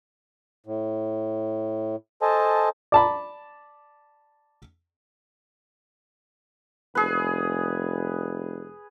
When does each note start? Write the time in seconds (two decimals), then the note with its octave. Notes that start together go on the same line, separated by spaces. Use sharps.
0.66 A2
2.22 A4 C5 D#5 G#5 A5
2.92 D5 A5 B5
6.95 F1 G#4 B4